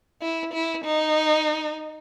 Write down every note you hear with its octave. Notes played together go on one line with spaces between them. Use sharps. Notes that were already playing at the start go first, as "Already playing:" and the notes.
E4
E4
D#4